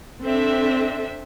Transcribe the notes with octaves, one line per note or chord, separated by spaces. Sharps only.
C4 D4 A4 E5